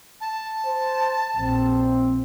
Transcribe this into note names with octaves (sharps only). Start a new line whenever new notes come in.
A5
C5
A#1 C4